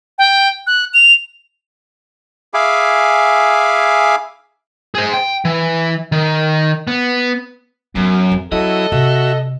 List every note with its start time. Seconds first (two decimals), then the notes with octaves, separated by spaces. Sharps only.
0.18 G5
0.67 F#6
0.94 F7
2.54 G#4 E5 F5 G#5 B5 D6
4.95 G#4 C5
5.14 G5
5.45 E3
6.12 D#3
6.87 B3
7.96 F#2 B3
8.32 F2
8.52 F#3 C#4 E4 A4 D#5
8.92 C3 F#4 E5